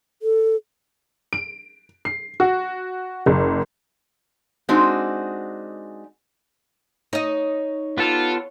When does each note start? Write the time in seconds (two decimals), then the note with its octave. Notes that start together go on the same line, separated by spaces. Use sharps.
0.22 A4
1.33 D7
2.05 C7
2.40 F#4
3.26 F#1
4.69 G#3 C4 D4 D#4 F#4
7.13 D#4 C#5 D#5
7.98 B3 F4 G4 A4